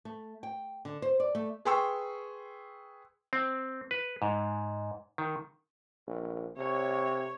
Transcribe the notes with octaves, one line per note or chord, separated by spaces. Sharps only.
A3
G5
D3
C5
D5
A3
G#4 B4 G5 C6 C#6 E6
C4
B4
G#2
D#3
A#1
C3 C#5